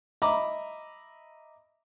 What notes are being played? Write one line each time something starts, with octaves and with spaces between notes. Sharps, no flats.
D#5 E5 A#5 B5 D6